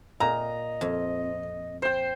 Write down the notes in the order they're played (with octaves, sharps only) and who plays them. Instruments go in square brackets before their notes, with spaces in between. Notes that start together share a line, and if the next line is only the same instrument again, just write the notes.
[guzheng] A#2 [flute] D#5 [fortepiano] A#5
[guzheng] F2
[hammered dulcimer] C5 G5